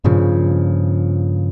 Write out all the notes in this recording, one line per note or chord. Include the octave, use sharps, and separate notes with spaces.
G2 A#2 C#3 F3